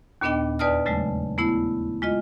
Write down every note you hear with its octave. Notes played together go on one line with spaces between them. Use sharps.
D#2 A#2 B3 D4 D#5 G5
E2 B4 D5 A5 D#6 F6
C#3 F#3 G#3 A3
A3 B3 E4
G#3 F4 D#5